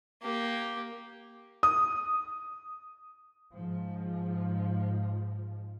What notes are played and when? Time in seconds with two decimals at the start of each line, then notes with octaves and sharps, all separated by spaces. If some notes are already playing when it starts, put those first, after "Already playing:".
0.22 A#3 G4
1.63 D#6
3.53 G#2 F3